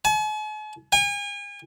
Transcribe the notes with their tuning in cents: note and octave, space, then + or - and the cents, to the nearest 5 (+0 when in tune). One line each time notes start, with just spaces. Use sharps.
G#5 +45
G#5 -40